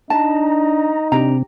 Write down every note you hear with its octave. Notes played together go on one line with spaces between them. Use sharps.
D4 D#4 A5 A#5
C3 C4 D4 G4 A#5